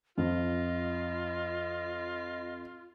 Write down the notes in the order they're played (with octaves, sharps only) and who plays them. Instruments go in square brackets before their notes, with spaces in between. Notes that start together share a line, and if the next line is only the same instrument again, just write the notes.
[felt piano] F2 [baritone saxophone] F4 [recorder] D#5